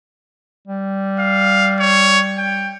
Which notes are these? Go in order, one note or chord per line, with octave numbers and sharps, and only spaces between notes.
G3
F5
C#5
G5